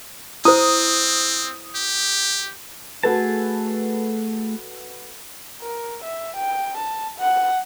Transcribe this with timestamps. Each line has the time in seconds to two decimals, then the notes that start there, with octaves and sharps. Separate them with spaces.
0.45 C4 E4 C5 D#6
1.75 G4
3.03 A3 F#4 G#4 A4 B4 A5
5.62 A#4
6.04 E5
6.36 G5
6.77 A5
7.19 F#5